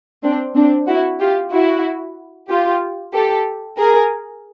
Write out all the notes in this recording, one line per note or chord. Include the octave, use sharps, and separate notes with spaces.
C4 D4
C4 D4
E4 F#4
F4 G4
E4 F#4
F4 G4
G4 A4
G#4 A#4